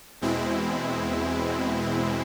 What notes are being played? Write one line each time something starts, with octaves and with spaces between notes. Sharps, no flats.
E2 B2 G#3 C4 E4